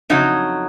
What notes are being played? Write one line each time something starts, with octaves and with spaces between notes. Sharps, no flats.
F2 C#3 F#3 D#4